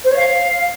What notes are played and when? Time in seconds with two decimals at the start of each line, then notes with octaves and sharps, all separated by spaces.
0.04 C5
0.10 C#5
0.17 F5